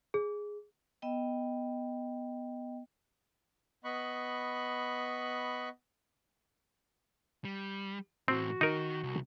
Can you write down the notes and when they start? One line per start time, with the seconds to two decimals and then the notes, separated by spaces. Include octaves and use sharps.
0.14 G#4
1.02 B3 D#5 G5
3.84 B3 D#5 B5 C#6 F#6
7.45 G3
8.28 A2 E3 C4 F#4
8.61 D#3 D#4 A#4
9.03 C2